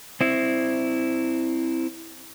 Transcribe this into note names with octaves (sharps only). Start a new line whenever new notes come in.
C4 E4